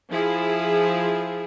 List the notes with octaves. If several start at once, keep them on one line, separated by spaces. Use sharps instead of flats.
F3 E4 G#4